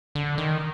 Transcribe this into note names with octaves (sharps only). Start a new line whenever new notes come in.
D3
D#3